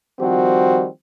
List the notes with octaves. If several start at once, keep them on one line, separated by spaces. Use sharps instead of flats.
D#3 F3 G3 C4 F#4